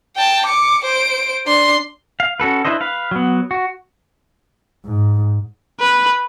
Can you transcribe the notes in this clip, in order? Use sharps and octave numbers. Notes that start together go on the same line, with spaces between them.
G5 A5
D6 C#7
C5 D7
D4 C6
F5
C#4 F#4 A4 B4
D4 E4 B4 C5 D#5
B4 F5
F#3 B3
F#4
G#2
B4